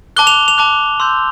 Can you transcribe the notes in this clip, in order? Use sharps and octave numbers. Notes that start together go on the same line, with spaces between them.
A5 D6 F#6 G7
F7
F7
A5 D6 F#6
C6 E6 G6